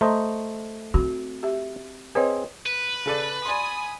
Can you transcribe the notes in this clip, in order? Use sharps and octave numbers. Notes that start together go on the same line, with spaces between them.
A3 C5 D#5 A#5
C4 F#4
G4 E5
C4 G#4 B4 C#5 D#5
B4
C#3 A4 D5
D5 G#5 B5 C6 D#6